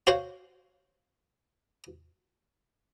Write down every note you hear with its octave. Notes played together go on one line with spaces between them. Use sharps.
F#4 C5 C#5 F5 F#5